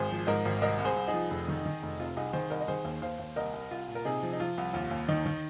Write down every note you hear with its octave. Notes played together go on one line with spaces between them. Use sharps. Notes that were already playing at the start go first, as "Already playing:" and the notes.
Already playing: G#1 G#4 C5
F3
G#2 A#4 D#5
G#1
C2 A#4 D#5
C2
G#4 C5
C2
D#4 G#4
F3
F1
D#3
D#3
F1
C3 F4
C2 D#4 G#4
D#3 G#4 C5
C2 A#4 D#5
D#5
D#3 G#4 C5
D#2
D#2 C5 F5
D#2
C2 A#4 D#5
C2
C2 F4
A#2
A#4
C3 D#4 G#4
F3
D#4
F3 F4
C2
D#2 F4
D#2
D#3 D#4
D#3